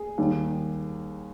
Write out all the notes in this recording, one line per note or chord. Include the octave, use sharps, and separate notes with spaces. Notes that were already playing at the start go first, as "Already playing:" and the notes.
Already playing: G#4
D#2 D#3 G3